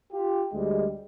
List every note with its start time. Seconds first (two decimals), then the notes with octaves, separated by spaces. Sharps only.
0.13 F4 G4
0.52 D2 G3 G#3